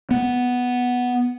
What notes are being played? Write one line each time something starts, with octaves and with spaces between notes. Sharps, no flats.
B3